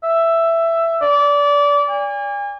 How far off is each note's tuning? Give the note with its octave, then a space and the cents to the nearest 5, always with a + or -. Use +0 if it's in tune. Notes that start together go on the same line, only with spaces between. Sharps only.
E5 +10
D5 -25
G#5 -40